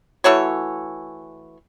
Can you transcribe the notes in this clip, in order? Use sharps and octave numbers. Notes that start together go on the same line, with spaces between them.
E3 A3 F#4 C#5